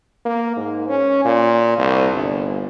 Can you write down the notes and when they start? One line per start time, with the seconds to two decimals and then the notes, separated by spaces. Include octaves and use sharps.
0.26 A#3
0.57 G#2
0.89 C#4
1.25 A#2
1.78 C2
2.14 G1